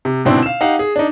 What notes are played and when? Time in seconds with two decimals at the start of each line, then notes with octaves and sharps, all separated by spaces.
0.05 C3
0.25 G#2 B2 D3 C4 D4 E4
0.42 F5 E7
0.61 D#4 G4 F5 F#5
0.79 G#4
0.96 D4 D#4